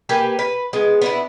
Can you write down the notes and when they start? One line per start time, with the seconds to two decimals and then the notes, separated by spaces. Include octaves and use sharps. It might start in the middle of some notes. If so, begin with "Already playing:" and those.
0.09 A#3 G4 B4 G#5
0.39 B4
0.73 G#3 B3
1.02 B3 D4 E4